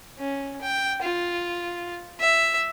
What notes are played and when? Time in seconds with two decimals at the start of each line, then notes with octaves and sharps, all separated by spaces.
0.18 C#4
0.62 G5
1.03 F4
2.20 E5